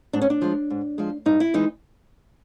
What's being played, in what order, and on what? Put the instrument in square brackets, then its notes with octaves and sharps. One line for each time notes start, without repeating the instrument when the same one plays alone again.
[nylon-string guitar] G#2 D4
C#4
D4
F3 G#3
G#2
F3 G#3
G2 D#4
E4
E3 G#3 D#4